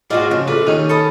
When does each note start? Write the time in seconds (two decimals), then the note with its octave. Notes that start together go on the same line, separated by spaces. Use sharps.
0.10 G#2 G#3 D#4 F4 F#4 D5 F5
0.31 C#3 F3
0.48 A#1 D4 A4 B4
0.67 D#2 D#3 C#4 D#4
0.89 A4 B5 D#6